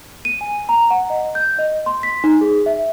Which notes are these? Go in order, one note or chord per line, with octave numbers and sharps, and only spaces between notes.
D#7
G#5
A#5
F#5
D#5
G6
D#5
C6
B6
D#4
G#4
E5